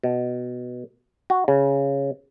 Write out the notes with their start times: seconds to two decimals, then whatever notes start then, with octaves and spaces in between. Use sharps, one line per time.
0.04 B2
1.30 F#4
1.48 C#3